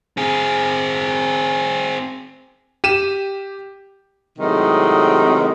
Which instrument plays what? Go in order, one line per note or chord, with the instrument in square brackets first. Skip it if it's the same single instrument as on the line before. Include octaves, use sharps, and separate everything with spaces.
[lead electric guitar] C4 G#4
[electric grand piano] G4 D#7 E7
[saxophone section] A2 C3 D#3 F#3 G#3